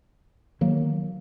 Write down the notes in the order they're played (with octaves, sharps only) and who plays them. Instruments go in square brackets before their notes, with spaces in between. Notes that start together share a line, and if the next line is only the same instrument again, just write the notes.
[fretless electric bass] D#3 F#3 A#3